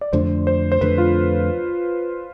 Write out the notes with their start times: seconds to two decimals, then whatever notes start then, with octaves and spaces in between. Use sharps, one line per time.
0.01 D5
0.13 F2 D3 A3 C5
0.47 C5
0.72 C5
0.81 F2 D3 A3 B4
0.98 F4